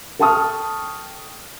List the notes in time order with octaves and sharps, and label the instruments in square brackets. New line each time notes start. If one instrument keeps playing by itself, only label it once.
[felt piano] A4 G5 A5 C#6 D#6 F6